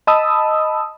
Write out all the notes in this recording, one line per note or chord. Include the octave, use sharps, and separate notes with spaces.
D#5 A5 B5 D#6 E6